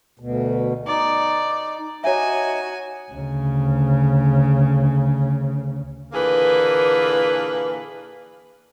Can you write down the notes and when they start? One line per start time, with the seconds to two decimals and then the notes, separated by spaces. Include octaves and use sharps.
0.19 D2 B2
0.87 D#4 D5
2.04 D#4 F#4 C#5 E5 G#5
3.12 D2 C#3
6.13 A#2 D3 E3 A#3 G#4 B4